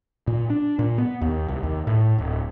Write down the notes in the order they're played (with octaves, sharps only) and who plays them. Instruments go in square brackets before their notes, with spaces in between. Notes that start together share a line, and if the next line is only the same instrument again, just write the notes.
[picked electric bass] A#2
D4
A#2
B3
D#2
C2
D#2
A2
D1